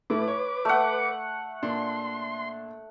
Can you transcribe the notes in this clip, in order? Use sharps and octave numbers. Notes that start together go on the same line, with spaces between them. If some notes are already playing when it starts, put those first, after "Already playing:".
A2 A3 E4 B4 D6
C#5
A3 F#5
A#2 D4 C6